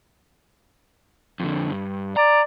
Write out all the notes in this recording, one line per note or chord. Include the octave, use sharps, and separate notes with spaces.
F2 D3
G2
D5 A#5